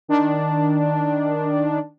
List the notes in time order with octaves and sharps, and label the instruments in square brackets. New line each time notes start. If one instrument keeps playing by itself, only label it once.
[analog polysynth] D#3 D4